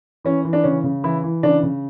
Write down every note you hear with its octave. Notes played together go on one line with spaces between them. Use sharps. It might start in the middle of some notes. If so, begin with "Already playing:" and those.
E3 C#4
E3
D4
C#3 C#4
C#3
E3 E4
E3
C#3 D4
C#3